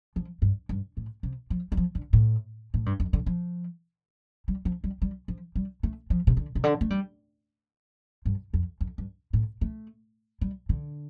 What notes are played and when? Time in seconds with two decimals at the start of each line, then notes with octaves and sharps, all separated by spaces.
0.16 F3
0.42 G2
0.69 G2
0.97 A2
1.23 C3
1.50 F3
1.72 G3
1.77 F3
1.95 D3
2.13 A2
2.74 A2
2.86 G2
3.00 F2
3.13 D3
3.26 F3
4.48 G3
4.65 F3
4.84 G3
5.02 G3
5.28 F3
5.55 G3
5.83 A3
6.10 F3
6.27 C3
6.37 D3
6.55 C3
6.64 D3
6.81 A3
6.90 G3
8.25 G2
8.54 F2
8.81 F2
8.98 G2
9.33 A2
9.61 A3
10.41 G3
10.69 D3